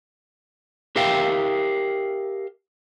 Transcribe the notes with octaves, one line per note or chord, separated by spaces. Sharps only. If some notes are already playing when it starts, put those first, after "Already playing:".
G4 A#4 E5 F5 G5